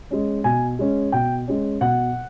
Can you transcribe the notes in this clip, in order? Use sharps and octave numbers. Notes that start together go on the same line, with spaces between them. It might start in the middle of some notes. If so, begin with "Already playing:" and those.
G#3 C#4
B2 G#5
G#3 C#4
B2 G5
G#3 C#4
B2 F#5